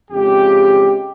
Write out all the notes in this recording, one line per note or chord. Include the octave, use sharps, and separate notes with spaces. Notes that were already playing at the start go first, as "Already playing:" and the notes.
F2 C#3 G#3 G4